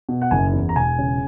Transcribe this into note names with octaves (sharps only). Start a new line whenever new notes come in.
B2
F#5
F#1 G#5
E2
A#5
E1 G#5
C#3